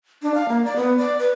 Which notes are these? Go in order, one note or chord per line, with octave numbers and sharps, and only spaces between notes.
D4
F5
A#3
D5
B3
D5
B4